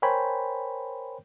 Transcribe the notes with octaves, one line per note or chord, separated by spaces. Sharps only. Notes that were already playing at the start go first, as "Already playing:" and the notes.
A#4 C5 C#5 G5 G#5 B5